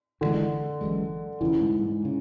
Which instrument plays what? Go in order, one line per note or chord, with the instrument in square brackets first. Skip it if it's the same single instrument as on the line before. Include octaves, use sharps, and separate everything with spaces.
[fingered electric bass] F#1 F#2 E3 G#3 [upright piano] D3
[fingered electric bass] F#1 F#2 E3 G#3
[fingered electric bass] E1 D2 C#3 [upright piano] E3
[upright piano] G#2
G#2
[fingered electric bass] C#3